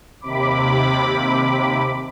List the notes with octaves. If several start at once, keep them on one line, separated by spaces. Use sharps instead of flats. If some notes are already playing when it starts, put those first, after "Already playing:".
D#2 C3 B5 D6